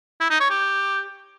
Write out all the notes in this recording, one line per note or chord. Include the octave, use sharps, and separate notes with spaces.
E4
D#4
C#5
G4